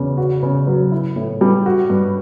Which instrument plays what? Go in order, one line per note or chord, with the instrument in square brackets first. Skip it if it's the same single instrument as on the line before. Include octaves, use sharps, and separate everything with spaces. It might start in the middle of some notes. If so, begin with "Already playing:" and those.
Already playing: [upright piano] E2 C#3
F#4
C#3
F#3
E4
A2
G3
F#4
G2